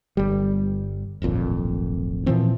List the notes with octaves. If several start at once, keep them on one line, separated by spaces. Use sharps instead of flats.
G1 G3
D1 G#1 F2 A#2
A#2 E3 F3 C4